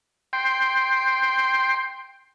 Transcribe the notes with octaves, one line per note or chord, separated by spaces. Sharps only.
G5 C6